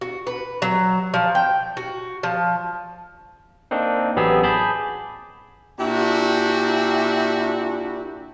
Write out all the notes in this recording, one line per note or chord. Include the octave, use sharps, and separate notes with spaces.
F#4
B4
F#3
F3
G5
F#4
F3
A#3 C4 D4 D#4
A1 F#3 B3 G4 G#4 E6
G#4 A5 B5 D6 G6
A#2 D4 E4 F#4 G4